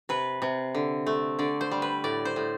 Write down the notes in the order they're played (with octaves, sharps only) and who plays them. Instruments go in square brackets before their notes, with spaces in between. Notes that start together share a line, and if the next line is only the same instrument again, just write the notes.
[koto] C3 B4
C3
D3
A3
D3 D5
C5
G3
B4
A2 D5
C5
A2